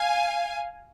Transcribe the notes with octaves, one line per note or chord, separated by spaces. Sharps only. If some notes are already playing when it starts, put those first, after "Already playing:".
Already playing: F5 G#5